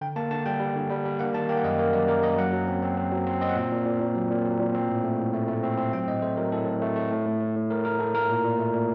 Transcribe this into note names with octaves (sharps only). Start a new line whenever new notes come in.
D3 G5
A#3 A5
D3 A5
G3 G5
G3
D3
G3
G3
A#3 F#5
D#3 A5
A#3 G5
F#5
F#2 D#5
A#3 A#4
F#2 D5
A#3 A#4
F#2 D#5
F#3 F#5
F#3
C4
C4
C4
F#3
C4
C4 D#5
F#5
A#2 G5
A#2
A#2
A#2
F#3
A#2
F#3
A#2
C4
A2
A3
A2
A3
A3
C4
C4
F#3 G5
A2 D#5
A3 C5
F#3 A#4
A2 A4
A2
A3
A3
A2
A2
A2
A2
A2 A#4
A2 A#4
A2 A4
A2 A#4
A#2
A#2
A3
A#2